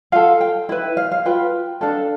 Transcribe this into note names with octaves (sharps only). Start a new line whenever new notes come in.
F4 A4 F5
G5
E4 B4
F5
F5
F4 B4 G5
D4 A4 F5